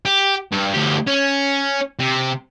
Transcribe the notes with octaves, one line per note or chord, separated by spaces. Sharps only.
G4
G2
D2 G4
C#4
C3